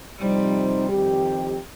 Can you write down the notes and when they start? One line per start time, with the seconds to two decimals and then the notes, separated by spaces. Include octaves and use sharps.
0.19 C3 F3 G3 C4 D#4 C5
0.89 F2 D#3 C4 G4